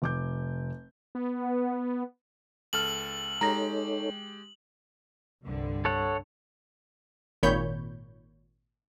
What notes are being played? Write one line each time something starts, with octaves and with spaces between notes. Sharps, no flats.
F1 D6 G6
B3
C#2 A4 F6 F#7
G#3 D#4 G4 A4 C#5 A#5 A#6
C2 G2 D3
A4 C#5 F#5
G#1 A#2 D#3 C#5 B5 G6